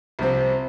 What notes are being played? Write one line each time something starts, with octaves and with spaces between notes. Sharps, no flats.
C2 C3 F3 C4